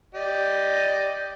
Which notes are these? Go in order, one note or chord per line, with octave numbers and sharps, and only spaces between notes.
G4 D5 D#5